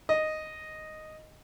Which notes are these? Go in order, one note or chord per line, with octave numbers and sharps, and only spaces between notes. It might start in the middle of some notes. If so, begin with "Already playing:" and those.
D#5